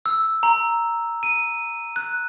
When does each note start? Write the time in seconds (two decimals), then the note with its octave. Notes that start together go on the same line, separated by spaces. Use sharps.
0.06 E6
0.43 A#5
1.23 D#7
1.96 F#6